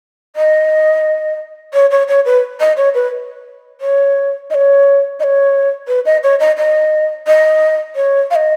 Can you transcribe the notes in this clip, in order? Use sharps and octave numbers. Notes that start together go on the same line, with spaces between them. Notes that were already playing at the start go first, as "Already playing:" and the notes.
D#5
C#5
C#5
C#5
B4
D#5
C#5
B4
C#5
D#5
C#5
D#5
C#5
B4
D#5
C#5
D#5
D#5
D#5
C#5
F5
D#5